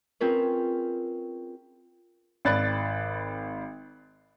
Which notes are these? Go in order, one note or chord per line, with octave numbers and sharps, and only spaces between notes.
C4 C#4 F4 G#4 A#4 B4
G#1 D5 B5 F#6 A6